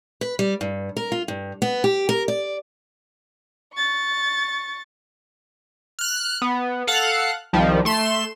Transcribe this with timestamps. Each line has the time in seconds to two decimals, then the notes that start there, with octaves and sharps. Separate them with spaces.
0.21 B4
0.39 G3
0.61 G2
0.97 A#4
1.12 F4
1.28 G2
1.62 B3
1.84 G4
2.09 A#4
2.28 D5
3.75 C#6 A6
5.99 F6 F#6
6.42 B3
6.87 A4 F5 F#5 F#6
7.53 C2 D#3 F3 G3
7.85 A3 C6 E7